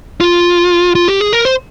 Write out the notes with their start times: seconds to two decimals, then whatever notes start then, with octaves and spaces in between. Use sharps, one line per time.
0.21 F4
0.95 F4
1.08 G4
1.21 G#4
1.32 A#4
1.45 C5